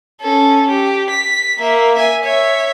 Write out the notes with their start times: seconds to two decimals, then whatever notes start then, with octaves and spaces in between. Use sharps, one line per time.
0.21 C#4 A4
0.70 G4
1.11 B6
1.59 A#3 E5
1.95 E5 G#5
2.24 C#5 E5